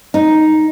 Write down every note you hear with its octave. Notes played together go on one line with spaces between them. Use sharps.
D#4